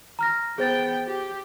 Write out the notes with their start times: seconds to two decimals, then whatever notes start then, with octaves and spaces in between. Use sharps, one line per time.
0.19 A#5 F6 A#6
0.58 B3 G#4 C5 G5 A6
1.07 G4